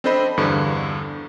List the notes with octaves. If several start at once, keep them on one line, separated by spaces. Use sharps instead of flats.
C4 D4 A4 C5 D#5 B5
E2 G2 D3